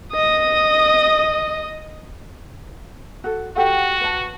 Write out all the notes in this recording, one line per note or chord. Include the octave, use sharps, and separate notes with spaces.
D#5 D#6
F#4 A4
F#4 G4 A4 F#5
B4 A5